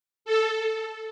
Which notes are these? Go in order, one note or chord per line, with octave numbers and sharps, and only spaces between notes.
A4